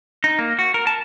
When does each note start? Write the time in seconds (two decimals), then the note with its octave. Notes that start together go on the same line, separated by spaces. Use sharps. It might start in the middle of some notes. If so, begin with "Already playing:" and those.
0.24 D#4
0.39 A#3
0.59 F#4
0.74 A#4
0.87 A5